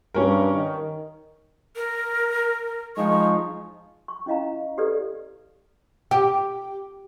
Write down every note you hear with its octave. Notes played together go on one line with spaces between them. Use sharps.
G2 C#4 A#4
D#3
A#4
F3 G#3 D#4 C#6
C#6
C#4 E4 D#5 F5 A#5
G4 A4 B4 D5
G4